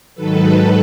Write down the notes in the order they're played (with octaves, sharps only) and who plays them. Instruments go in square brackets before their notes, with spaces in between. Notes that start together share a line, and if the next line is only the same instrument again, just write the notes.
[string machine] G#2 D#3 F#3 A4 B4